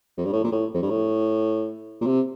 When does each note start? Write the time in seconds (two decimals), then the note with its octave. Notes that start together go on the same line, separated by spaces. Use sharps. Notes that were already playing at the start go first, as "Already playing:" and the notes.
0.18 F2
0.26 G2
0.33 A2
0.44 A#2
0.52 A2
0.74 F2
0.82 G2
0.90 A2
2.01 A#2
2.07 C3